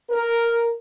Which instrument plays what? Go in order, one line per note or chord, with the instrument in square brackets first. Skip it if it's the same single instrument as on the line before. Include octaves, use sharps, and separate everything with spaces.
[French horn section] A#4